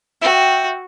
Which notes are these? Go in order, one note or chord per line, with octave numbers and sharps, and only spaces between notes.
F#4 E5 G5